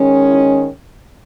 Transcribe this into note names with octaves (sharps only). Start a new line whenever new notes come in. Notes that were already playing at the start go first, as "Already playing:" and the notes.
Already playing: D#3 G#3 C#4
E4